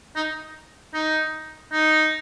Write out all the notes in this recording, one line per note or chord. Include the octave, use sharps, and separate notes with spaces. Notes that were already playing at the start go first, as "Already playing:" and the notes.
D#4
D#4
D#4